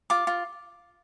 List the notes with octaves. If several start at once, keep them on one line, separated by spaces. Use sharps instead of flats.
F4 D6
F4